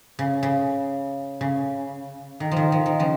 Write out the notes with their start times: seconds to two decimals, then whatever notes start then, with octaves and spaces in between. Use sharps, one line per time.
0.19 C#3
0.43 C#3
1.41 C#3
2.40 D#3
2.51 D#3 F3
2.72 F3
2.86 D#3
2.99 C#3 F3